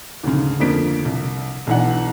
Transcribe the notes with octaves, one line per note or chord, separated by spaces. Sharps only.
D2 G#2 C#3
F2 D3 F3 A#3 B6 D7
C2
B1 E3 D4 F#5